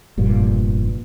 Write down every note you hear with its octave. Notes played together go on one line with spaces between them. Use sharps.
F1 G2 A#2